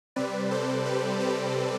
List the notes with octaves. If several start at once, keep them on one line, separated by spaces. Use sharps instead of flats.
C3 G3 C4 B4 D5
A4 C5
G4 B4
G4 B4